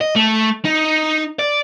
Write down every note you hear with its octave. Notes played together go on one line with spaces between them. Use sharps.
D#5
A3
D#4
D5